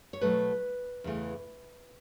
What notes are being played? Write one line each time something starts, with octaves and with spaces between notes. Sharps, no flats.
C#5
B2 F#3 A3 B4
E2 C#3 E3 A3